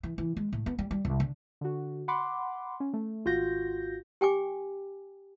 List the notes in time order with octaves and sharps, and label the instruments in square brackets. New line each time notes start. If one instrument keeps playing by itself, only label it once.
[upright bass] E3
E3
G#3
A2
B3
G3
G3
C2
D3
[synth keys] D3 F#4
F#5 B5 C6 D6
C#4
A3
G#1 F4 F#4 G6 A#6
[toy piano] G4 G5 G#5 D6